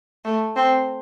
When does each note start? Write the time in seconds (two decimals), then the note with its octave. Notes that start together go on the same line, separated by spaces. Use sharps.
0.25 A3
0.56 C4